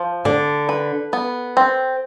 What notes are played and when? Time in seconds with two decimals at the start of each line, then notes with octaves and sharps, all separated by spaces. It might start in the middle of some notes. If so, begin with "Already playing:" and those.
Already playing: F3
0.25 D3 D4
0.69 B4
1.13 B3
1.57 C4